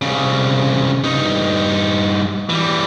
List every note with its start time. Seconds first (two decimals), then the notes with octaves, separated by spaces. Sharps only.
0.02 C2 C#3
1.04 G2 D#4
2.50 E3 G3